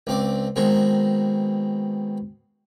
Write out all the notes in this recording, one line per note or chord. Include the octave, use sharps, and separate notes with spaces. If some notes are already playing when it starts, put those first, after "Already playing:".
C#2 C4 D5
B2 D#3 G#3 C4